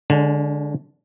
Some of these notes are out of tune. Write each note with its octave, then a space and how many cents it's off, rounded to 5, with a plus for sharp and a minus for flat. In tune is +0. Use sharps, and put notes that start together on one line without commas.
D3 +0 G#3 +0 C#4 +45